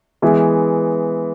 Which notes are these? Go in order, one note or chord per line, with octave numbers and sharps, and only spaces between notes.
E3 G#3 B3 E4